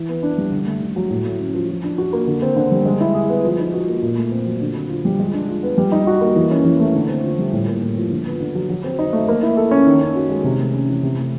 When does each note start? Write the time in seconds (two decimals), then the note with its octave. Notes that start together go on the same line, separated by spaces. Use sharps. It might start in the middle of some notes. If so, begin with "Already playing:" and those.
Already playing: E3
0.09 B3
0.23 D4
0.38 G3
0.52 D3
0.66 A3
0.82 D3
0.96 F#3
1.10 A2
1.25 A3
1.39 C#4
1.54 F3
1.69 F3
1.84 D4
1.98 F#4
2.13 A#3
2.27 D3
2.42 C4
2.56 D3
2.72 G3
2.86 G#3
3.00 E4
3.15 G#4
3.29 B3
3.44 F3
3.59 D#4
3.74 F#4
3.88 A#3
4.02 A#2
4.17 A3
4.31 C4
4.46 F#3
4.61 D3
4.75 C4
4.89 F4
5.05 G3
5.19 G#3
5.34 D4
5.48 F4
5.63 B3
5.78 G3
5.92 D#4
6.07 F#4
6.21 A#3
6.36 E3
6.51 C#4
6.65 E3
6.80 A3
6.95 D3
7.09 C4
7.23 F4
7.39 G3
7.53 A2
7.68 A#3
7.82 A2
7.97 F3
8.11 D3
8.26 B3
8.40 D3
8.55 F#3
8.69 F#3
8.84 C4
8.99 D#4
9.13 A3
9.28 A#3
9.43 E4
9.57 A4
9.71 C#4
9.86 D#3
10.01 C#4
10.16 F#4
10.29 G#3
10.44 C3
10.59 A3
10.74 C#4
10.89 E3
11.03 C3
11.18 A3